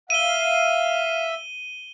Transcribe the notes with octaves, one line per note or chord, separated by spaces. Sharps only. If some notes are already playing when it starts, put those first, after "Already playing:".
E5 F5 D#7 G7